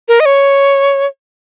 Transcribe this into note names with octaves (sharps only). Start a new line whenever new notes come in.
A#4
D#5
C#5